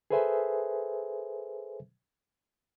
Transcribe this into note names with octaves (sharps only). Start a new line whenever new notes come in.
G#4 A4 B4 C5 E5 G#5